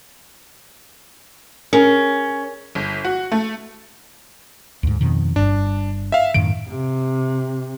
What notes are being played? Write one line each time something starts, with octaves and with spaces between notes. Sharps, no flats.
C#4 G#4 A#4
G1
F#4
A3
D2 G#2
F2 B2 D#3
G1 G2 D4
E5 F5
F#2 A2 D#3 D7
C3